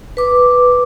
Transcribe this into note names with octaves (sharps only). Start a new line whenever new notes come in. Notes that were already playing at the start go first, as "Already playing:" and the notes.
B4 D6